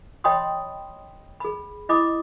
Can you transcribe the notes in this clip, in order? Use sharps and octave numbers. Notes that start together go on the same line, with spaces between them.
C#5 D#5 G5 B5 C6 D#6
G#4 B5
E4 D#5 B5 D6 D#6